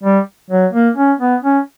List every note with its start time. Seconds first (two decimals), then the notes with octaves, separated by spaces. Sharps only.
0.03 G3
0.50 F#3
0.73 A#3
0.96 C#4
1.19 B3
1.43 C#4